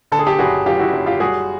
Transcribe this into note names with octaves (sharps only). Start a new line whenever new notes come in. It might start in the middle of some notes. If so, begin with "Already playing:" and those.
D3 A4
G#4
G4 A4
F#1 F#4 G#4
F#2 F4 G4
E4 F#4
F#1
F4 G4
G3 F#4 G#4